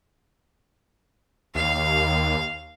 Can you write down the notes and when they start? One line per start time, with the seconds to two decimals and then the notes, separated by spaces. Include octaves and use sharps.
1.55 D#2 F5